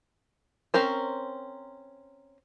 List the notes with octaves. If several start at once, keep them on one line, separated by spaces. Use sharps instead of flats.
C4 C#4 A#4 C5